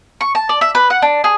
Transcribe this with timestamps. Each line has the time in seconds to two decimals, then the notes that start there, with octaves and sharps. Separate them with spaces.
0.21 C#6
0.35 A5
0.49 D5
0.61 E5
0.75 B4
0.90 F#5
1.02 D4
1.24 G#4